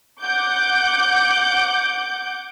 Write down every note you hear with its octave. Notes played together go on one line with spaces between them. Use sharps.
F#5 D6 G6